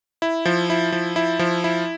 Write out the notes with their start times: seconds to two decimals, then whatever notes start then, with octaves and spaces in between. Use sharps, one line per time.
0.22 E4
0.45 F3
0.70 E4
0.92 F3
1.16 E4
1.39 F3
1.64 E4